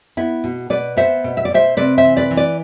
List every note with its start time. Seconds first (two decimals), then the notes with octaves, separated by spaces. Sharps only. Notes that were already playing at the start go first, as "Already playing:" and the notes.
0.17 B3 E4
0.44 B2
0.70 B2 B4 D5
0.97 B3 C5 E5
1.24 B2
1.37 E5
1.45 D5
1.50 B2 C5 E5
1.77 C3 B4 D5
1.98 C5 E5
2.04 E3
2.17 B4 D5
2.31 E3
2.37 B4 D5